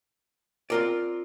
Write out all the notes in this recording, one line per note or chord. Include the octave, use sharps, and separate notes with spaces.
C4 F4 A#4 D5